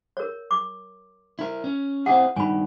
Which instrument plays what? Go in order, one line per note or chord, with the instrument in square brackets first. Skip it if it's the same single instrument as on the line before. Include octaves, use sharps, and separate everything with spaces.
[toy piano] A#4 C#5
D6
[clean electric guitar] E4 A#4
C#4
[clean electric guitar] C4 E4 G#4 [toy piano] F#5
[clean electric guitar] G2 D#3 [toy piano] G#5 B5